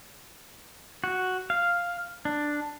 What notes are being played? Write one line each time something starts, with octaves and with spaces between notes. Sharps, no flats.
F#4
F5
D4